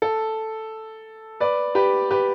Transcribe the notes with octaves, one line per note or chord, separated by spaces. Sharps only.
A4
B4 D5
G4 B4
G4 B4